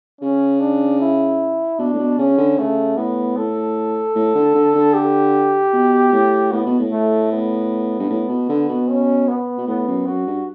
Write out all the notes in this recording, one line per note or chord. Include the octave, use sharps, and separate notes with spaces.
C#3 C#4
D4
E4
B2 D4
A2
B2
C#3 C#4
D3
C#3 A3
A2 B3
A2 A4
A2
D3
D3
D3
G4
B2
A2
A2 B3
B2
A2
A3
B3
G2
A2
B2
D3
B2
C#4
B3
B2
A2 B3
F#2
F#2 F#4
G2